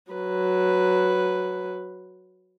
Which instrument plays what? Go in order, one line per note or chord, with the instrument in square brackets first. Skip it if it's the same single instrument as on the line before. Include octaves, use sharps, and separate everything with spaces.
[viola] F#3 B4